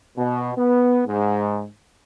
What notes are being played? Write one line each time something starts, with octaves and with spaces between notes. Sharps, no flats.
B2
B3
G#2